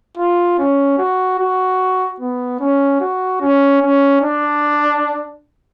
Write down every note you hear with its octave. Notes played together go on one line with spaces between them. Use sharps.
F4
C#4
F#4
F#4
B3
C#4
F#4
C#4
C#4
D4